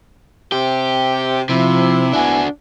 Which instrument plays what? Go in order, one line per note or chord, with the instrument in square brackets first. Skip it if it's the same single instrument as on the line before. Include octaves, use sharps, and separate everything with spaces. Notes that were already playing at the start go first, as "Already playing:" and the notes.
[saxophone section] C3 [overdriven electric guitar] G4
[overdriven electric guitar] C3 [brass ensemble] F3 [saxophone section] E4
[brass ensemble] B3 G#5 [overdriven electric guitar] D4 F#4